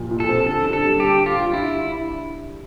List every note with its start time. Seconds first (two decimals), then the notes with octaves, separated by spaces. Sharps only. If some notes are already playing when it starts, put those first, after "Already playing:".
Already playing: A#2 F3
0.11 A#2
0.20 A4
0.29 C4
0.46 D3 A4
0.65 D4
0.73 A4
0.82 G3
1.00 D3 G4
1.18 D3
1.26 F4
1.35 D4
1.53 G2 E4